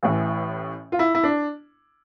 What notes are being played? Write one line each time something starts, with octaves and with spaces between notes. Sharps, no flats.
A1 A2 E3
F4
E4
E4
D4